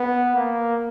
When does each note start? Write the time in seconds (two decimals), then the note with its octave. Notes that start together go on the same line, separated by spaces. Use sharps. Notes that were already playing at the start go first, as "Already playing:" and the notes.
Already playing: B3
0.35 A#3